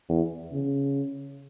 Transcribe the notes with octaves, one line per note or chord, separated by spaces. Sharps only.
E2
C#3